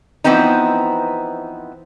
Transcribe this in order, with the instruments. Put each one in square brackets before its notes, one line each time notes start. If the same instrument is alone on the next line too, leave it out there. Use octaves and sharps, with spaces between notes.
[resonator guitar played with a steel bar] E3 F3 B3 C4 D#4